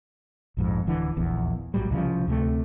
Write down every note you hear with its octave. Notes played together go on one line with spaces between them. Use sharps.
A#1 F2 G#2
D1 D3 E3
D#1 A#1 E2
A#1 A2 F#3 G3
C2 C#3 F3
D2 C3 G#3 A3